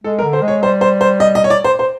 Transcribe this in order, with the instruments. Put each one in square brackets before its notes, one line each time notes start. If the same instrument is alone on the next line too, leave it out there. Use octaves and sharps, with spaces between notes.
[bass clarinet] G#3 [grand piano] A4
[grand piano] A#4
[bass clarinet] D3
[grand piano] C5
[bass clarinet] G#3
[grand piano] C#5
[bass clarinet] G3 [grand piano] C5
[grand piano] C5
C5
D#5
D#5
C#5
D5
C5
C5